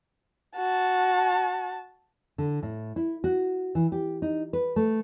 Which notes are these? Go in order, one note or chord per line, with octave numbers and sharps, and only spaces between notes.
F#4 A5
D3
A2
E4
F#4
E3
G4
D#4
B4
A3